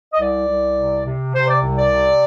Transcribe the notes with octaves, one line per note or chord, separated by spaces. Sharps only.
D#5
C2 D5
C2
C3
C3
C3 C5
D5
C2
D5
C3